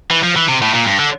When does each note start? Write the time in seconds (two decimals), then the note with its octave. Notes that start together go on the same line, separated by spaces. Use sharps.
0.11 E3
0.23 F3
0.36 E3
0.49 C3
0.62 A2
0.74 A#2
0.87 G2
0.99 D3